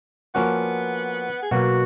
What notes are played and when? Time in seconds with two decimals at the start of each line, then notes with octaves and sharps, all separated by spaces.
0.35 F3 A#3 B3 C#4 F#4
1.43 G#4
1.51 B2 F#3 A#3 F#4